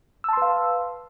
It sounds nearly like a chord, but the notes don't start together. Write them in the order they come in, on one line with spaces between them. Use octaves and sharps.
E6 A5 C6 B4 F5